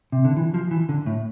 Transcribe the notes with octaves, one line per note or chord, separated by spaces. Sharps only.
C3
D3
E3
F3
E3
D3
A2